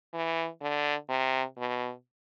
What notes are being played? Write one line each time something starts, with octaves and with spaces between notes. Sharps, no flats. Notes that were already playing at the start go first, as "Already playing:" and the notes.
E3
D3
C3
B2